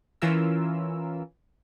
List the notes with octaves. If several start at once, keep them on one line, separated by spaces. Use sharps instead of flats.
E3 C#4 F4 A#4 E6